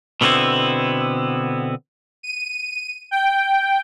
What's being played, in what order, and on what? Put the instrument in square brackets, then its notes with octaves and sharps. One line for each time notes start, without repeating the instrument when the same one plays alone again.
[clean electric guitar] B2 D3 B3 C4 E4
[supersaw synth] D#7
G5